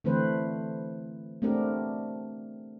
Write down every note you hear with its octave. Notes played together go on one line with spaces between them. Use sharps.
D3 E3 A3 C4 B4 C5
A3 B3 C4 D4 G4 A#4